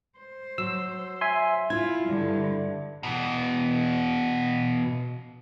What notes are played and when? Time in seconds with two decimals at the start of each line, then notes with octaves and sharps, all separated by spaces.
0.18 C5
0.58 F#3 E6
1.21 E5 G#5 C6
1.70 E4 F4 G#6
2.05 G2 D3
3.03 B2 E3